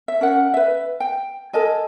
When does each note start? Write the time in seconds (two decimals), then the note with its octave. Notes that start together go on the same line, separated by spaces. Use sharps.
0.08 E5
0.21 C#4 A#4 F#5
0.54 B4 E5
1.00 G5
1.53 A4 A#4 D#5 G#5